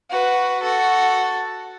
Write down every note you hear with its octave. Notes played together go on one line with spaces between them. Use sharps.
F#4 B4
F#4 A4